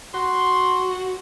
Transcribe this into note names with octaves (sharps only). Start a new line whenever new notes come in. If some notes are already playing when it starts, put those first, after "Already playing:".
F#4 C6